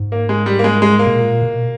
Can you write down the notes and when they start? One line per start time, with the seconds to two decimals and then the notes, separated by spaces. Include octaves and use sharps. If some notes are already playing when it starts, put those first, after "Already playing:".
Already playing: G#2
0.12 A#3
0.29 G#3
0.46 G3
0.59 A#3
0.64 G#3
0.82 G#3
0.99 A#3
1.06 B2
1.15 A#2
1.42 B2